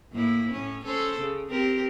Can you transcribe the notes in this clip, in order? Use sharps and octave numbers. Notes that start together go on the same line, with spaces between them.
A2 A#3 E4
A2 C#4
C#4 A4 C5
C#3
C4 G4 A#4